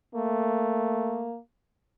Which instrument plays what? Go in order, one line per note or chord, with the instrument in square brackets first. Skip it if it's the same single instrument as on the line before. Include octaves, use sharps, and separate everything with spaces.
[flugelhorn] A3 [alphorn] A#3